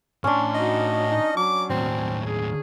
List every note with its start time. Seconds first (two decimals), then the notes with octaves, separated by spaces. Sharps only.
0.24 A2 C#4 D4 C6
0.55 D#4 F#4 D#5
1.09 D#4
1.37 F#3 D6
1.70 D#2 A2 C4
2.24 G#4